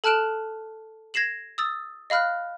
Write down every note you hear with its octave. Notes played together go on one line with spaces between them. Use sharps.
A4 A5 F6 F#6 D7 E7
G#6 A#6 C7 E7 F#7
D#6 E6 A6
D#5 F5 B5 F6 F#6